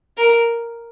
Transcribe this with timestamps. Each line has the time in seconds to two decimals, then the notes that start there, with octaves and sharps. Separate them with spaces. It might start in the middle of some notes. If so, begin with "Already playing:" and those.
0.18 A#4